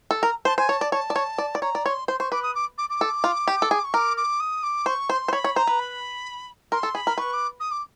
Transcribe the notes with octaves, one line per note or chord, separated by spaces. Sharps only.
A4
A#4 A#5
C5 A5
C5 G#5
C#5 A5
D5
C#5 A5
D5
C#5
D5
D5
C#5 A#5
D5
C#5 C6
C5 C6
C5 C#6
B4 D6
D#6
D6
D6
D6
A4
F4
G4
A4
G#4
C#6
A#4 D6
D6
D#6
D6
C5 C#6
C5 C6
C5
C#5 B5
C#5
C5 A#5
B4
B5
A#4 C6
A4
G#4 B5
A#4
B4 C#6
D6
D#6
D6